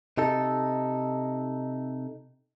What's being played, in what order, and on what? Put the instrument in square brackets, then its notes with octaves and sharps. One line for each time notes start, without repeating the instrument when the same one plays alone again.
[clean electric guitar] C3 D#4 A4